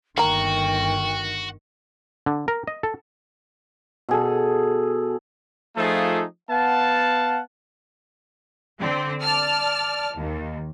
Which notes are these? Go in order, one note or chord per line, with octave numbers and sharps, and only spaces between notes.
G1 D#3 A#3 F#4 G5 A#5
D3
A#4
D#5
A4
B2 G#4 A4
F3 A3 D#4 F4 G#4 A4
B3 F5 F#5 A5
D3 C4
D5 A5 F6
D#2